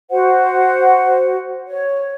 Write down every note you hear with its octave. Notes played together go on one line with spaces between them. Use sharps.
F#4 C5 F#5
C#5